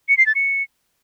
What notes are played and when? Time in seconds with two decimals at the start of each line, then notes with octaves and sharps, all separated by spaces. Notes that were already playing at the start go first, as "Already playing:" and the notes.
0.09 C#7
0.18 C7
0.26 A6
0.35 C#7